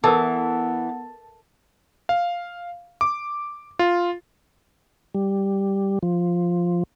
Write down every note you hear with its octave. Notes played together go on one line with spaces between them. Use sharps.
E3 B3 A4 A#4 A5
F5
D6
F4
G3
F3